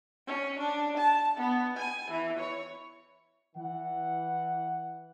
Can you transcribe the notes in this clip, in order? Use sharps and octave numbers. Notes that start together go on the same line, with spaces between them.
C#4
D4
A5
B3
G#5
E3
C#5
E3 F#5